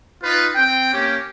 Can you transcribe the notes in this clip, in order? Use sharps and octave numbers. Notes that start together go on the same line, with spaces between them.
D#4 F4 B4
C4 G5
A#3 C#4 G4